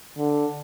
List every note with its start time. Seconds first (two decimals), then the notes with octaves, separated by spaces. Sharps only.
0.17 D3